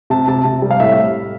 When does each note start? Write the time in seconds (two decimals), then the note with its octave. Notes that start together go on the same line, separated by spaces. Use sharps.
0.10 C3 A5
0.28 C3 A5
0.45 C3
0.62 G3
0.71 F5
0.80 A2 E5